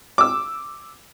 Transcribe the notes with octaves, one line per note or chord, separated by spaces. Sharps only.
D6 E6